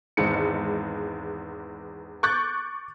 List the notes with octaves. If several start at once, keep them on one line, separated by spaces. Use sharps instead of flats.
G#1 E2 G#3 C#7
C#6 D6 F#6 G6 A6